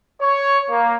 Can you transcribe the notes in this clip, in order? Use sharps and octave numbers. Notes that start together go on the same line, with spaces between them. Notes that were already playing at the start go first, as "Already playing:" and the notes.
C#5
A#3